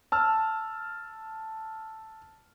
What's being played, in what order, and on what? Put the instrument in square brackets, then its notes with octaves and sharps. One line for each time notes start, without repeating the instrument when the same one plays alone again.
[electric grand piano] A5 E6 F6